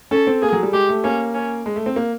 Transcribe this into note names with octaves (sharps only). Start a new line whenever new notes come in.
C#4 A4
C4
A#3 G#4
F#3
G3
G#3 G4
A3
A#3 C#4
C#4
G#3
A3
C4
A#3